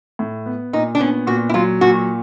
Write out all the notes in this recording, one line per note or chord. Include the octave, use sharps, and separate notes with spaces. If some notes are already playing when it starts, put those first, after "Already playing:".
A2
B3
A#2 D#4
D4
B3 C#4
A#2 F#4
E4
F#3 F4
A#2 F#4